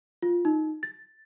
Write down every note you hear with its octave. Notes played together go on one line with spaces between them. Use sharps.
F4
D#4
A6